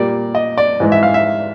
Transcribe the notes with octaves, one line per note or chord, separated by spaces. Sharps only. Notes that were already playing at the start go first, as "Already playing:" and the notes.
Already playing: A#2 G3 A#3 D5
D#5
D5
G#2 E3 G#3
E5
F5
E5